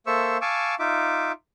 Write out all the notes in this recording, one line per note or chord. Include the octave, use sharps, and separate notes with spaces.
A#3 A4 C5 E5 C#6 E6
F5 G#5 A5 C#6 D6 E6
D#4 F4 E5 D6